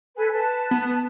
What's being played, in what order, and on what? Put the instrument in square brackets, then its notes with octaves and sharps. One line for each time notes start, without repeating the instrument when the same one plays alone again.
[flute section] A4 B4 G#5
B4 A5
[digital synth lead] B3